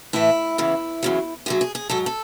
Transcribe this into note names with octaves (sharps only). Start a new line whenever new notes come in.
A2 E3 E4
E2 C#3 E3
E2 C#3 F#3
D2 D3 F#3 G#4
G#4
G#4
G#2 F#3 A4
A4